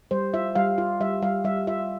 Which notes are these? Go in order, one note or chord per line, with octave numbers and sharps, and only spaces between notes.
G3 C5
F4 E5
G3 F5
F4
G3 E5
G3 F5
G3 E5
F4 E5